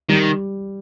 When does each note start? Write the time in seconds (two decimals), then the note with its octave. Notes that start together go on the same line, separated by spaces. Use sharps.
0.09 D#3 G3